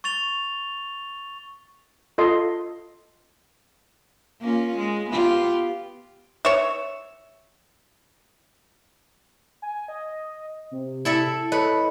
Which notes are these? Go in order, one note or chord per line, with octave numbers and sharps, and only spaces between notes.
C#6 A6 F7 G7
F4 A4 D#5 C6
A#3 C#4 F4
G#3
B3 F4 G4
C#5 E5
G#5
D#5
C3
E4 A4 E5
A4 B4 C#5 D#5 C#7